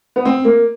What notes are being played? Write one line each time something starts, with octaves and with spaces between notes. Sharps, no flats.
B3
C4
A#3